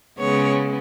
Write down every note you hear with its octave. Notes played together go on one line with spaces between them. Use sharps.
C#3 G#3 B3 C#5